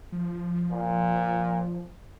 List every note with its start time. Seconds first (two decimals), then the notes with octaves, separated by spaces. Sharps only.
0.12 F3
0.71 A#2